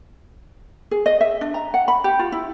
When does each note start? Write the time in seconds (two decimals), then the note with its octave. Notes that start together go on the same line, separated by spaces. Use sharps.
0.91 G#4
1.06 D#5
1.21 E5
1.41 D4
1.54 A#5
1.74 F#5
1.88 B5
2.04 G4
2.19 F4
2.32 E4